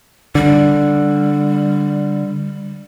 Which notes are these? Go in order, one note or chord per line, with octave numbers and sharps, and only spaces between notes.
D3 G3